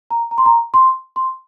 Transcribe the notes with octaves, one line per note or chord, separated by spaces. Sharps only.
A#5
A#5
C6
A#5
C6
C6